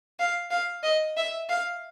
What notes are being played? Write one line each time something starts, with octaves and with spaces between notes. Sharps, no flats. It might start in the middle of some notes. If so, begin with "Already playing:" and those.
F5
F5
D#5
E5
F5